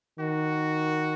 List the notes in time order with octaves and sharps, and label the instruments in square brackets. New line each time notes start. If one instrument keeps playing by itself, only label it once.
[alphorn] D#3 [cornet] F#4